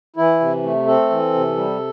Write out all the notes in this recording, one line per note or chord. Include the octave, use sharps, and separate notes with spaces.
E3 E4
C3
A3
C4 A4
E3
C3
G3